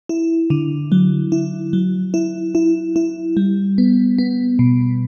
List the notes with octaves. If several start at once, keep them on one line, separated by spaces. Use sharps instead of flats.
E4
D3
F#3
E4
F#3
E4
E4
E4
G3
B3
B3
B2